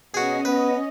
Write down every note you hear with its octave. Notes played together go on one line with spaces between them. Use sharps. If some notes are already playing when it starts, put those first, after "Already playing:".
B2 C#4 F#4 G#4 D#5
B3 B4